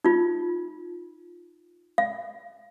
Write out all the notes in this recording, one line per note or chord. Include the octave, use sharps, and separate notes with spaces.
D#4 F4
F5